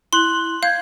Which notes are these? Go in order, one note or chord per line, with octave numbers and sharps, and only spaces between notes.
E4 C6 F#6 F#7
F5 G6 G#6